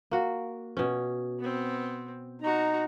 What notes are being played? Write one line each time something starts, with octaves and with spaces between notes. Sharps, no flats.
A#3 F#4
B2 C#4
B3 C4
D#4 F#4 A#5